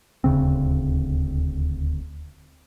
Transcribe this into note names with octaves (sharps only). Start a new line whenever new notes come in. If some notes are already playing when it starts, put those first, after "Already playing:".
D#1 D2 C#3 C4